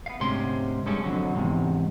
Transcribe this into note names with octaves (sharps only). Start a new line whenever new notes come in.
B3 F5
D2 G#2 C3 C#4 C6
G2 G3 G#3 C#4 A4
F2 A2 D3 F#3
E2 G#2 C3